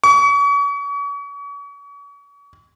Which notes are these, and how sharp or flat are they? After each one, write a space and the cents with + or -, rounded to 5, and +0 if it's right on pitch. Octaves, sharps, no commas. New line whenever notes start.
C#6 +40